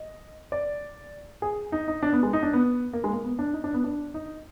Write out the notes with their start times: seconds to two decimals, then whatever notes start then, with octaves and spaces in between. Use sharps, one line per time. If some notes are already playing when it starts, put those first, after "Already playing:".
Already playing: D#5
0.52 D5
1.42 G#4
1.72 D#4
1.88 D#4
2.03 D4
2.13 B3
2.23 G#3
2.33 D#4
2.43 D4
2.53 B3
2.93 A#3
3.04 G#3
3.13 A#3
3.24 B3
3.39 D4
3.54 D#4
3.64 D4
3.74 B3
3.84 D4
4.14 D#4